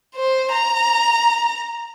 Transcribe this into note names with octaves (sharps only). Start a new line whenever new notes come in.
C5
A#5